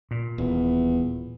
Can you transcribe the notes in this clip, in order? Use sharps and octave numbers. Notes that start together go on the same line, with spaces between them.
A#2
D#1 E2